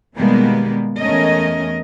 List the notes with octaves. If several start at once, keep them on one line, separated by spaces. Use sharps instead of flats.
B2 D#3 G3 G#3 A#3 B3
E2 A3 C#4 A#4 D#5